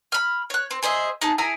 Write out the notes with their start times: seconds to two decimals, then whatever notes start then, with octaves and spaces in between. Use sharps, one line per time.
0.12 B5 F6
0.50 C#5 F#6
0.71 C4
0.83 G#4 C5 D#5 E5
1.22 D#4 G#4 A5
1.38 E4 G#4 G#5 A#5